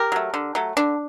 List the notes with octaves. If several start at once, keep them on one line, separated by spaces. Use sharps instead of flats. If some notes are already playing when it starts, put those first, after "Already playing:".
Already playing: G4 A#4
F#3 A3
D3
F#3 A3
D3 D4